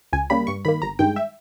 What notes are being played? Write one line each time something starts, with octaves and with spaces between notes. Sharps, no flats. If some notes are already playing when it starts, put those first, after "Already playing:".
C#2 G#5
C#3 G3 A#3 B5
G2 C#6
D#3 A#3 B5
G1 A#5
G2 D#3 G#3 G5
E5